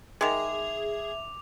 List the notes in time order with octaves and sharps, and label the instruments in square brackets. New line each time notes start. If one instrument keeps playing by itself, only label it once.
[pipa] D#3 G#3 [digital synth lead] G#4 [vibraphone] E5 [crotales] D6 F7